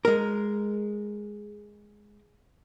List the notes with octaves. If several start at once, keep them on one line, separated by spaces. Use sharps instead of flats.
G#3 A#4